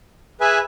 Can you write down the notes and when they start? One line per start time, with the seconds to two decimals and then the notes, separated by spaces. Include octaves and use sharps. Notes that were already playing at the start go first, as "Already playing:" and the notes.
0.40 G#4 B4 E5 G#5